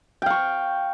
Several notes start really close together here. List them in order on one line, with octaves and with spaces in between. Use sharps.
G5 F5 C#6